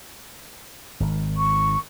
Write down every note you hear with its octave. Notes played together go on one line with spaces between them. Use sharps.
G#1 D#3
C#6